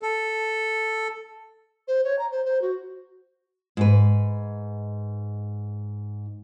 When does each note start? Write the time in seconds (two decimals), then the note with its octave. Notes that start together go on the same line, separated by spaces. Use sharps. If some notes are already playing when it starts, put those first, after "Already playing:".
0.02 A4
1.88 C5
2.04 C#5
2.19 A#5
2.32 C5
2.45 C5
2.62 F#4
3.77 G#2 B4